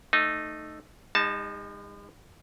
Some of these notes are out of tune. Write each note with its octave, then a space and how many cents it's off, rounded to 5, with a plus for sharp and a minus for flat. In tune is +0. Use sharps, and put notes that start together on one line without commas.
A3 +0 D#4 -15
G#3 -45 D#4 +0 A5 +0